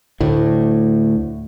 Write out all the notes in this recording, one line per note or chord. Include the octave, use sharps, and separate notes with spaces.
D2 A2